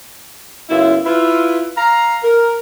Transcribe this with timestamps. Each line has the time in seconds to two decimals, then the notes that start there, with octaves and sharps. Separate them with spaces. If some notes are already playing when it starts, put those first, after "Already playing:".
0.70 F#2 C#3 B3 E4 F4 E5
1.06 E4 F4 B4
1.76 F5 A#5
2.24 A#4